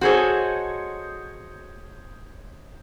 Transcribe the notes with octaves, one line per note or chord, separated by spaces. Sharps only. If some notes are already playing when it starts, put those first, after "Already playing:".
F#4 G#4 A4 C5 C#5 D#5